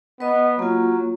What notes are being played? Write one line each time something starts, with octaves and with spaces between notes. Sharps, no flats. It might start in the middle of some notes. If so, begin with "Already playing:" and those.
B3 B4 D#5
F#3 A#3 F4